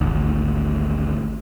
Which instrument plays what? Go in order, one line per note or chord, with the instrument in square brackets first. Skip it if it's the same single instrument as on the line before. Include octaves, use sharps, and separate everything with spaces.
[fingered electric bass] G#1 D2